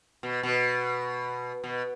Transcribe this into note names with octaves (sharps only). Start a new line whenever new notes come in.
B2
B2
B2